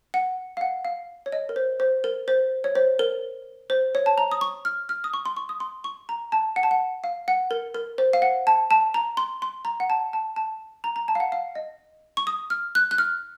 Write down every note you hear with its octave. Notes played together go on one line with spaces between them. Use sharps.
F#5
F5
F#5
F5
C#5
D#5
A#4
C5
C5
A#4
C5
C#5
C5
A#4
C5
C#5
A5
A#5
D#6
C#6
F6
F6
D#6
C#6
C6
C#6
D#6
C6
C#6
A#5
A5
F#5
A5
F#5
F5
F#5
A#4
A#4
C5
F5
F#5
A5
A5
A#5
C6
C6
A#5
F#5
A5
A5
A5
A#5
A#5
A5
F5
F#5
F5
D#5
C#6
D#6
F6
F#6
F#6
F6